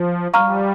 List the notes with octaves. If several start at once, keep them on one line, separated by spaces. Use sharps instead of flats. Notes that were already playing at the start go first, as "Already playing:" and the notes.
Already playing: F3
G3 F5 A#5 C#6 F6